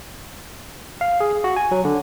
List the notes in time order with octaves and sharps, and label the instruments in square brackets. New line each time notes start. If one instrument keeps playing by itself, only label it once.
[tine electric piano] F5
G#4
F#4
G#5
F#3
D3